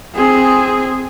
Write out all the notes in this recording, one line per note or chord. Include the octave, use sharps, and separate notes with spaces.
C4 G#4